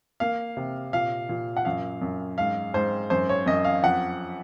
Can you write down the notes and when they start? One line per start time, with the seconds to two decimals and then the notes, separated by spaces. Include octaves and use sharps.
0.20 A#3 F5
0.57 C3
0.93 A#2 F5
1.29 A#2
1.57 F#5
1.65 F#2 F5
2.02 F#2
2.38 G#2 F5
2.74 G#2 C5
3.10 F#2 C5
3.29 C#5
3.46 F#2 D#5
3.64 F5
3.83 F2 F#5